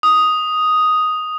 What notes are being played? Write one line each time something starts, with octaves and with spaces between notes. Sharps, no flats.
D#6